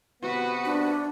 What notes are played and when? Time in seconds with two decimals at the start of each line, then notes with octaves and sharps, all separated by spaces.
0.22 C3 B3 F#4 B4
0.66 D4